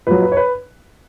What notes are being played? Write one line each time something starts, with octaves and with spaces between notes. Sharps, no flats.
A#2 F#3 B4
B4
C#5
B4